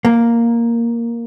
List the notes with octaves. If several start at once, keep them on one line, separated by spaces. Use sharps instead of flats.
A#3